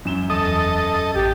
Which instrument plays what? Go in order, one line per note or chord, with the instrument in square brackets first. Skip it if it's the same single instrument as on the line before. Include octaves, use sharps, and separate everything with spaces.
[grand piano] F#2 E7 G7
[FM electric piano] E2 D#6 [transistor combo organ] A4 D#5
[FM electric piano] A1 A6 [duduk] G4